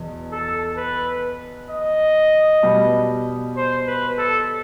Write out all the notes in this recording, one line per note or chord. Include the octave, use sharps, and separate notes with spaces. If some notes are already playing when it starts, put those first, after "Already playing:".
Already playing: E2 B2
A4
B4
D#5
B2 G3 B3
C5
B4
A4